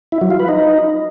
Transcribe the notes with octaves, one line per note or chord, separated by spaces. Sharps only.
E4
F#3
F4
B4
D#4